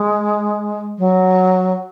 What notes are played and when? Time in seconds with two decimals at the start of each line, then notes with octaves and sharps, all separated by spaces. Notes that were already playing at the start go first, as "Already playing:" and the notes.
Already playing: G#3
0.98 F#3